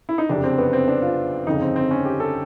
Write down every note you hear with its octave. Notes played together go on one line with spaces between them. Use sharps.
E4
D#4
F#1 F2 C3 D4
C4
B3
C4
D4
F4
G1 F2 C#3 D#4
C4
C4
C#4
G4
A4